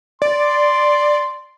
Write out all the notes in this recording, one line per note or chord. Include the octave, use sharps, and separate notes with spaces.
D5 C6